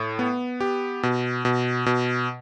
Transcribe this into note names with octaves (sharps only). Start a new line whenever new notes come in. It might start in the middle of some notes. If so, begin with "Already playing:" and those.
Already playing: A2
B3
G4
B2
B2
B2